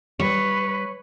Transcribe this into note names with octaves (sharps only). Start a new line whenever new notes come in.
G3 B4 C#5